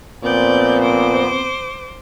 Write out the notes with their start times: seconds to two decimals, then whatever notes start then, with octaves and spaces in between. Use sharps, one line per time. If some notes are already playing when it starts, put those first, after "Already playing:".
0.23 A#2 F3 B3 C4 D5 G6
0.81 C5 D6